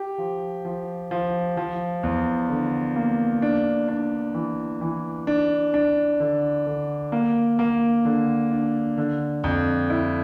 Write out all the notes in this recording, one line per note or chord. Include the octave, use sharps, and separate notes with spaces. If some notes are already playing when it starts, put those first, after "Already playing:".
Already playing: G4
F3
F3
F3
F3
E2
D3
A#3
D4
D4
E3
E3
D4
D4
D3
D3
A#3
A#3
D3
D4
D3
F2
E4